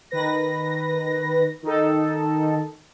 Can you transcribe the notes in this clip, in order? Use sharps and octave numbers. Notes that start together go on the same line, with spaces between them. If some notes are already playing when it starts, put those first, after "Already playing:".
D#3 B4 A#6
D#3 D#4 A4